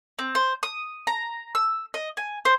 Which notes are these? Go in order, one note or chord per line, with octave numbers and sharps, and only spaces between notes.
C4
C5
D#6
A#5
E6
D#5
G#5
C5